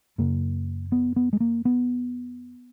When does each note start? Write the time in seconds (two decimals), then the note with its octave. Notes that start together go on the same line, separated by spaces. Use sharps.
0.18 F#2 C#3 A#3
0.92 B3
1.16 B3
1.33 G#3
1.40 A#3
1.65 B3